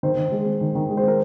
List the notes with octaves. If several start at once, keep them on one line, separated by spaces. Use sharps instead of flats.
D#3 C5
D#3
G#3
C4
D#3
D#3
G#3
C5
C4 A#4